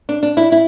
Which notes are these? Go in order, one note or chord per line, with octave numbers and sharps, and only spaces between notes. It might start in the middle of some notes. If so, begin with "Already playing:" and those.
D4
D4
E4
E4